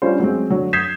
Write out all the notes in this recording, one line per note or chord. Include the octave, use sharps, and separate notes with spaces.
G3 C#4 D4 F4 C5
F#3 G#3 C4
D3 F#3
D#6 G6 G#6 B6 C7 E7